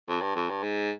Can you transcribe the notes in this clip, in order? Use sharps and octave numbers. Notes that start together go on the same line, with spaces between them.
F2
G2
F2
G2
G#2